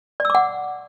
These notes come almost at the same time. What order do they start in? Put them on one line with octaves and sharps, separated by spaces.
D5 E6 D6 F#5